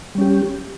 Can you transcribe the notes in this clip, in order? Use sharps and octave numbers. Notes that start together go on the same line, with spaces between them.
G3 C#4 G4